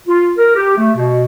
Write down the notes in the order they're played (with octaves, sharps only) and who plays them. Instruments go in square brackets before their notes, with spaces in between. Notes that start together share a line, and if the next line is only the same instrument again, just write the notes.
[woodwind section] F4
A#4
G4
A3
B2